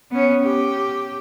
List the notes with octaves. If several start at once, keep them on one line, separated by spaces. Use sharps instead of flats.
B3 C#4
G4